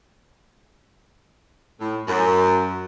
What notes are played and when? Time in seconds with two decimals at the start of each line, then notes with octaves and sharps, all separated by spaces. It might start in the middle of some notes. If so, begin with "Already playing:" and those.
1.80 A2
2.08 F#2